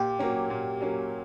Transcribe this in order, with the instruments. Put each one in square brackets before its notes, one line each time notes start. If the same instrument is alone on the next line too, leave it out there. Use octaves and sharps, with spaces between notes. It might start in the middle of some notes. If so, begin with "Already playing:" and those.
Already playing: [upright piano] A#2 [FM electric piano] G4
[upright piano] F#3 A#3 C#4
A#2
F#3 A#3 C#4